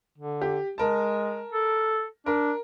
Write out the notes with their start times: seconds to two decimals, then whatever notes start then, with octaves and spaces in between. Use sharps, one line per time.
0.18 D3
0.41 G4
0.78 G#3 A#4 A5
1.52 A4
2.26 D4 A#4